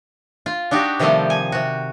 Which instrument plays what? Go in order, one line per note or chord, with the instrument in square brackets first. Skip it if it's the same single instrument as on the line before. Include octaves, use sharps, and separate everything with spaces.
[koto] F4
D4 D#4 F#4 G4
C3 D#3 F3 G3 A3 C4
G#5
C3 F#4